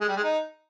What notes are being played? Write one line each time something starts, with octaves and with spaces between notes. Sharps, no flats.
G#3
G3
G#3
D#4